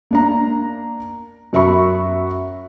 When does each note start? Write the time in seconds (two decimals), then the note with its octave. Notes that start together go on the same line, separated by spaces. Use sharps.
0.11 A#3 D4 A#5
1.53 F#2 F#4 E5 B5 C#6